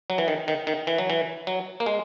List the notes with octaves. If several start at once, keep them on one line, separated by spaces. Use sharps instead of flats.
F#3
E3
D#3
D#3
D#3
E3
F#3
E3
F#3
A#3
G#3